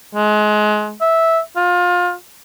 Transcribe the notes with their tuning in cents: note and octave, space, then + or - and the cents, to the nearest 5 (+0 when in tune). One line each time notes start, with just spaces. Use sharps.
G#3 +25
E5 -10
F4 +25